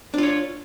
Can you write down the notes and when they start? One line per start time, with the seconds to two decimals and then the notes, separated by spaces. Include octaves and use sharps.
0.14 D4
0.18 F4
0.23 C#5